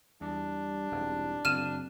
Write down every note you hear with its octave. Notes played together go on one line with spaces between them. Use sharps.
E2 G3 D4
E1 C2 G#2
F#1 C4 F6 D#7 E7